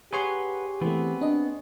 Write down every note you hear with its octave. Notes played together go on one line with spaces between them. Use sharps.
G4 G#4 B4 C#5 F#5 C6
E3 A3 B3 C4 B4
D4 D#5